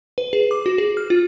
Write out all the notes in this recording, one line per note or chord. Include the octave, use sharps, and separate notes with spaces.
B4
G#4
D6
F#4
G#4
F6
F4